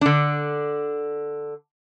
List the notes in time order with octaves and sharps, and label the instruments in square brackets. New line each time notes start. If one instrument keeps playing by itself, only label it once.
[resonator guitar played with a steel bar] D3 D4